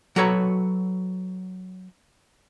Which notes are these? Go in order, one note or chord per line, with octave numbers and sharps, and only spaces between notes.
F#3 F#4 A4 B4 C#5 A#5